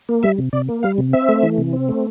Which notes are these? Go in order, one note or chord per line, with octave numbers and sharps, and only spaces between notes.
A#3
G3 E5
C3
C3 D5
A#3
G3 F5
C3
C4 E5
A3
E3
C3
C4
A3